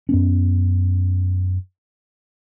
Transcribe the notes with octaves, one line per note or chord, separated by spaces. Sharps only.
F#2 B3 C#4